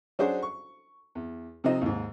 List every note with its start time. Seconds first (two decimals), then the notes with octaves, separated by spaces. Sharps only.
0.19 F#3 C#4 D4 F#4 G#4 C5
0.42 C#6
1.15 E2
1.64 C3 F3 C4 D#4 D#5
1.81 D#2 G#2